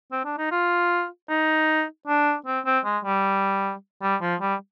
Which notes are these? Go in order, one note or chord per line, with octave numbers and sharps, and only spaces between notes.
C4
D4
D#4
F4
D#4
D4
C4
C4
G#3
G3
G3
F3
G3